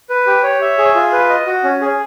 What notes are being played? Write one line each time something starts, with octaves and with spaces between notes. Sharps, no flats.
B4
G4
C#5
E5
G#4
F4
B4
D#5
F#4
C#4
G#4